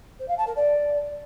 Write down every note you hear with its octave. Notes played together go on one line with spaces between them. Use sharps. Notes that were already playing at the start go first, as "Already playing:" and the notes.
C5
F5
A5
A#4
D5